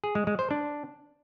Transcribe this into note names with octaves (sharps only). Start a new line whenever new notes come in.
G#4
G#3
G#3
C5
D4